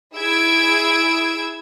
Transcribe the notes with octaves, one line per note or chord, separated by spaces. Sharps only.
E4 G#4 E6 G#6 D7